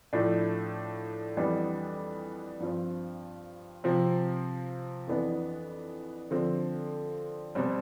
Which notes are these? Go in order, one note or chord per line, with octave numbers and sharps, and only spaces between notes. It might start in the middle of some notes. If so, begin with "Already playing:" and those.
A2 F3 A3 D4
F2 E3 G3 B3 D4
G2 F3 C4
C3 F3 C4
F2 E3 B3 D4
D3 F3 C4
B2 G3 C4